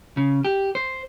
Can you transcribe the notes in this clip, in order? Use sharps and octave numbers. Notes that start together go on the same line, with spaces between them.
C#3
G4
C5